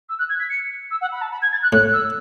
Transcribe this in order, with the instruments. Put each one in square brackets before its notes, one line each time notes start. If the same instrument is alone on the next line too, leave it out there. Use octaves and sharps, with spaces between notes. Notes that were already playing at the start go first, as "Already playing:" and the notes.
[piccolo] E6
F#6
G#6
B6
C#7
E6
F#5
B5
A5
B5
G#6
A6
F#6
[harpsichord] A2 [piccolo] F#6
[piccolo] E6